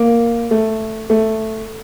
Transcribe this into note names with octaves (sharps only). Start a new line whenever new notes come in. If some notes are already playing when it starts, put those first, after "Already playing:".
Already playing: A#3
A3
A3